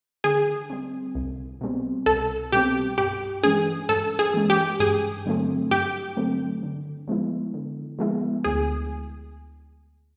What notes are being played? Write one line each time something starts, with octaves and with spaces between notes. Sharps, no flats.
D3 G#4
G3 C4
C2
B2 G3 C4
C2 A4
B2 G3 C4 G4
G2 G4
E3 G#3 C#4 G#4
G2 A4
G#4
E3 G#3 C#4
G4
G2 G#4
D3 F#3 A3 C4
G2 G4
D3 F#3 A3 C4
D3
F3 G#3 B3 E4
D3
F3 G#3 B3 E4
D2 G#4